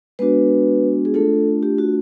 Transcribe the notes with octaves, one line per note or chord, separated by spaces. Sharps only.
G#3 B3 D4 F#4 B4
G#4
A3 D4 F4 A4
G4
F#4